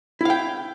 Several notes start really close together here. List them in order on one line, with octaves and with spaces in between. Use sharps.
E4 F5 G5